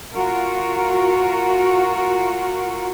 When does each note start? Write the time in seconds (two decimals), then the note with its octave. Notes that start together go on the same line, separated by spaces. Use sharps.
0.14 F4 F#4 A#4